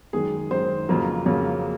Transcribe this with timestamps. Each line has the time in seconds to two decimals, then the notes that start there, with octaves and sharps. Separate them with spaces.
0.13 F#2 D#3 G#3 G#4
0.51 F#2 D#3 G#3 C5
0.89 F2 C#3 F#3 A#3
1.26 F2 C#3 F#3 A#3